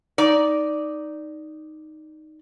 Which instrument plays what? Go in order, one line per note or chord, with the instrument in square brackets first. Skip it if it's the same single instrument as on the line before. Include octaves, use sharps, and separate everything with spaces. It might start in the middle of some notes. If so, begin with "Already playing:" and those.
[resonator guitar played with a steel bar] D#4 D5